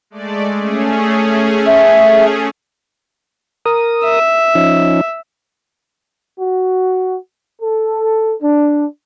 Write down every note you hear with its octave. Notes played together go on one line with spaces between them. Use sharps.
G#3 A3 D5
A3 C#4 G#4
E5
A#4 D#6
E5
F3 C#4 D#4
F#4
A4
D4